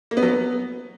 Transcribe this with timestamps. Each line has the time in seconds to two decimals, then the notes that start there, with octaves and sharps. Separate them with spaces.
0.11 A#3
0.17 B3
0.23 F#3
0.28 B3